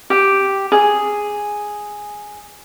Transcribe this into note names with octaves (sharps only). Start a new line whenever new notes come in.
G4
G#4